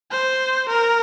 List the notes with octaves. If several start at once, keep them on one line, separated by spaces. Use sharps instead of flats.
C5
A#4